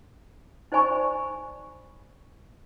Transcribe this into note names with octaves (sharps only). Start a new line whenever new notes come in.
D#4 C5 D5 G#5 B5 C#6